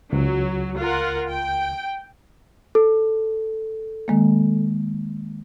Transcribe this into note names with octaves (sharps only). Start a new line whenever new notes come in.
C#2 F#3
F4 A#4 F#5
G5
A4
D#3 G#3 A#3